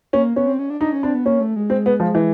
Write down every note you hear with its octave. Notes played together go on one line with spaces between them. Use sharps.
A#3 C#4
B3 C#4
C4
C#4
D4
D4 D#4
C#4
C4 D4
B3
A#3 C#4
A3
G#3
C4
B3
F3
E3